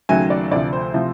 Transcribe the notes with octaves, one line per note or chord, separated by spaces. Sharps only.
D#2 C#3 F#3 A3 G#5
D5
D2 C3 F3 A3 D5
C5
C3 F3 A3